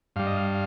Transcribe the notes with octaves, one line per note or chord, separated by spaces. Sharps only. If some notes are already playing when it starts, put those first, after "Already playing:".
G2 G3 F5
D#5
F5